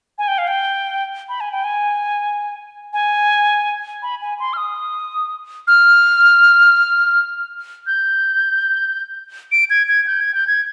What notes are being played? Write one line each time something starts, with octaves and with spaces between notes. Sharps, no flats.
G#5
G5
F5
G5
B5
G#5
G5
G#5
G#5
B5
G#5
C6
F6
D#6
F6
G6
D7
G#6
G#6
G6
G#6
G6
G#6